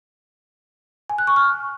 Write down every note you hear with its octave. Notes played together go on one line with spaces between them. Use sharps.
G#5
F#6
C#6
F6